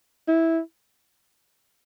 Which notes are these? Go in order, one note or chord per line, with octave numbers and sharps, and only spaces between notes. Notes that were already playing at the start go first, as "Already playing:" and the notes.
E4